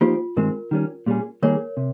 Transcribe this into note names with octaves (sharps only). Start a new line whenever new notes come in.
F3 A#3 D#4 F4 G4 C5
G2 D#3 G#3 C4 A#4
D#3 G3 C#4
A#2 G3 C#4 G#4
D#3 G3 A#3 D#4 G#4 A#4 C#5
C3